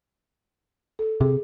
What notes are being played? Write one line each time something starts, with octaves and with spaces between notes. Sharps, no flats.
A4
C3 G#4